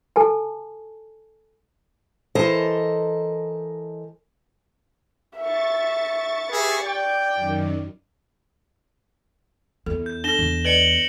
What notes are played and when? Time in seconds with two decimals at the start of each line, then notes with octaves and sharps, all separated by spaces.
0.16 A4 G#5 A5
2.35 E3 A4 A#4 C5 D#5 A5
5.38 E5 C#6 A6
6.52 G4 G#4 B4 E5
6.86 D5 G5
7.36 F#2 D#3
9.86 E2 A4
10.06 G6
10.24 D4 A4 A#6 E7 G7
10.39 E2
10.65 B4 D5 D#5 C#7 D7 F#7